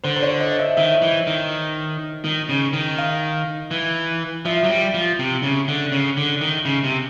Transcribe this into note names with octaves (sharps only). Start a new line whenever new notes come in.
D3 C5
C5
C#5
D#5
E5
D#3 E5
E3
D#3
D#3
C#3
D#3
F5
E3
F3 E5
F#3
G3
F3
C3
C#3
D3
C#3
D3
D#3
C#3
C3